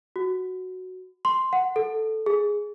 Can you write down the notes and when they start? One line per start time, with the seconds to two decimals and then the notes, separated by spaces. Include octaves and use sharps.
0.16 F#4
1.25 C6
1.53 F#5
1.76 A4
2.26 G#4